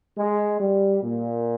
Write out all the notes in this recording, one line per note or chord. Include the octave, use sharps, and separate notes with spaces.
G#3
G3
A#2